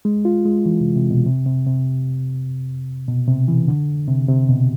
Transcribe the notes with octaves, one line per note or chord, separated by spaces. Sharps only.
G#3
F4
G#3
E3
C3
C3
B2
C3
C3
C3
B2
C3
E3
D3
C3
C3
B2